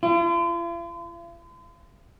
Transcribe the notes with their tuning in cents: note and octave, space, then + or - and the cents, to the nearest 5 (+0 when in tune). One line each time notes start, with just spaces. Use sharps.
F4 -45